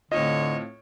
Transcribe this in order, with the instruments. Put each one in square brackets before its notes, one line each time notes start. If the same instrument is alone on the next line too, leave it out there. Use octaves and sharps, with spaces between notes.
[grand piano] A2 C4 F4 [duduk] D3 [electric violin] C#5 [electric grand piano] D#5